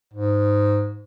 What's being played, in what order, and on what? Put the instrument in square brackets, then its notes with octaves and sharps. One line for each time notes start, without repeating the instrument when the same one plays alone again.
[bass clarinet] G#2